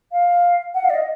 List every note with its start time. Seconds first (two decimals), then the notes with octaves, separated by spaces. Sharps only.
0.12 F5
0.74 F#5
0.84 F5
0.90 D5
0.95 D#5